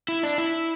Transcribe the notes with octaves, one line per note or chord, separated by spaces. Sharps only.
E4
D4
E4